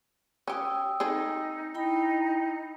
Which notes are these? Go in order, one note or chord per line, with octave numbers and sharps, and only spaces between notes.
C#4 G4 G5 D#6 E6
C4 D#4 G#4 A4
D#4 E4 G5 B5